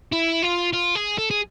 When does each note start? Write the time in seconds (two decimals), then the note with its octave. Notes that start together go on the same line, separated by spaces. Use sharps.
0.12 E4
0.42 F4
0.73 F4
0.95 G#4
1.18 A4
1.30 G#4